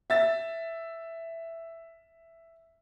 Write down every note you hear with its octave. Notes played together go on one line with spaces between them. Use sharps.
E5 A6